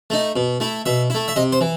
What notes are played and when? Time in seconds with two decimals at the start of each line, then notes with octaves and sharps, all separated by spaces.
0.10 A3 D#4
0.36 B2
0.60 A3 E4
0.86 B2 E5
1.10 A3 E4
1.28 E5
1.36 C3 D#5
1.52 C5
1.61 E3